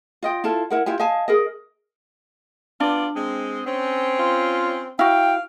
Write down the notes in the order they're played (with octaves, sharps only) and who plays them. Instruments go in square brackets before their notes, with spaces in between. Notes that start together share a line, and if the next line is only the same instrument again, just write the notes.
[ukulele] F4 D#5 G5
E4 F4 A4 A5
E4 A#4 F#5
E4 F4 G4 G#5
D#5 F5 G#5 A5
G#4 A#4 D#5
[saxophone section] B3 F4 D5 [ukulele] D4
[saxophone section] G#3 C4
C4 C#4
[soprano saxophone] F4
[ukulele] E4 F#4 [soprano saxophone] F5 [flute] G5